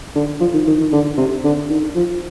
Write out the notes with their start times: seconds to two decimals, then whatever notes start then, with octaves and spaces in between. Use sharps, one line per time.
0.16 D3
0.41 F3
0.54 D#3
0.67 D#3
0.79 D#3
0.93 D3
1.18 C3
1.44 D3
1.70 D#3
1.95 F3